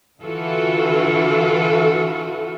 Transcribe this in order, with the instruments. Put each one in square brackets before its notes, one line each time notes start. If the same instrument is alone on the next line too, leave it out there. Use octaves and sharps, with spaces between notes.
[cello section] D3 E3 F4 F#4 A4